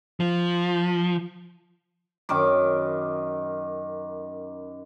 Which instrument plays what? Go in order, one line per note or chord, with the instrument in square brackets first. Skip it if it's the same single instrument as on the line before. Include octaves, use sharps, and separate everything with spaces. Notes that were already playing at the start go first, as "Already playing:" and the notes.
[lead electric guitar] F3
[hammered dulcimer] F#2 D#3 A#4 D6